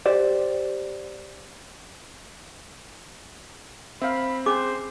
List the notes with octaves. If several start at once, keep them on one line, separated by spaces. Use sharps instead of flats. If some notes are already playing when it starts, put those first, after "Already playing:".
G4 C5 D5
C4 E5 F5 B5
C#4 G#4 C5 D6